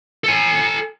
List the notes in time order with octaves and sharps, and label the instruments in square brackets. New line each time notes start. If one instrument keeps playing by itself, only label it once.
[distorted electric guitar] A4 G#5